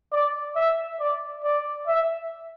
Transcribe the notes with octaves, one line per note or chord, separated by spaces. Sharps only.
D5
E5
D5
D5
E5